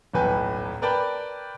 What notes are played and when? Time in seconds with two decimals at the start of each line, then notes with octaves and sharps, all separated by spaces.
0.14 D#1 B1 A2 B4 G#5 G6
0.82 A#4 B4 D5 G5 A5 B5